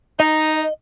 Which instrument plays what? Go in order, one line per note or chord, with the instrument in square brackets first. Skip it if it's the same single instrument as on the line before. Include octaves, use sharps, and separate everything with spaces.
[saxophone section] D#4 [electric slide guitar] D#5